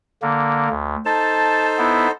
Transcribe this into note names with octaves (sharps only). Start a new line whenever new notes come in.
D3 A#3
D2
D#4 A4 C5 A5
B3 E4